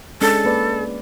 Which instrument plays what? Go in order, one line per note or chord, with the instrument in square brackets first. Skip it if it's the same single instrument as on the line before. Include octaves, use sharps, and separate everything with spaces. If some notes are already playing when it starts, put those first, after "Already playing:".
[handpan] G#3 C#4 D4 [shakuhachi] A4
[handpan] A#3 B4 D5